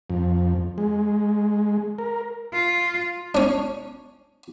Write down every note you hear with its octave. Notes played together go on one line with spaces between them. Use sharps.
F2
G#3
A#4
F4
C#4 D4